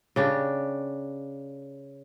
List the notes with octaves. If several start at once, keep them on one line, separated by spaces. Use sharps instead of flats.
C#3 D4 G4